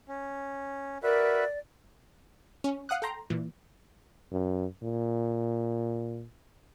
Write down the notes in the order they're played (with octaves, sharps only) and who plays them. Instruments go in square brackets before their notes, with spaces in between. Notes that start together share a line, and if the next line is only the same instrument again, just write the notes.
[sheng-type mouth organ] C#4
[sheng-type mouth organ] F#4 B4 E5 [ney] A#4 [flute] D5
[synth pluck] C#4
F5 F#5 D#6 F#6
A4 G5 A#5 C6
A#2 E3
[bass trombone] F#2
A#2